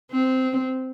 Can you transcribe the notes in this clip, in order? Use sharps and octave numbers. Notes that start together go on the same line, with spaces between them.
C4